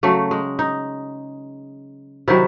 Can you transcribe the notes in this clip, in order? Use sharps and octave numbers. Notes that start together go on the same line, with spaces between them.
C#3 F#3 A3
G#3
D#4
C3 D#3 F#3 E4